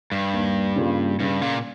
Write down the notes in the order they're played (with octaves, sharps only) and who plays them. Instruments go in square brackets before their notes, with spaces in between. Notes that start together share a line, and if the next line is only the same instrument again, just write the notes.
[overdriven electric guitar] G2
[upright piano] D#2
C#3 G3 A#3 F4
[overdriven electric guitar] G2 [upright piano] C#3
[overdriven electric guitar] A#2